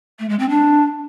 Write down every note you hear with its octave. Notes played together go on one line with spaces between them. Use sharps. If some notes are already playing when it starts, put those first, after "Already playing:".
A3
G#3
C4
D4